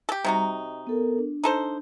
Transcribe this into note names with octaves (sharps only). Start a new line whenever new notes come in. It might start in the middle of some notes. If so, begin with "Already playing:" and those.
G4 A4
C3 G3 D#4 F#4 A#5
D#5
B3 A4 A#4
D4
D#4 A4 C5